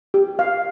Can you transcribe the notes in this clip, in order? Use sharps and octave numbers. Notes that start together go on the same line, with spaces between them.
G4
F5